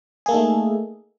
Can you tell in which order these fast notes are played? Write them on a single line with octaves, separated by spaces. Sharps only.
G#4 A#3 A4 D#4 A3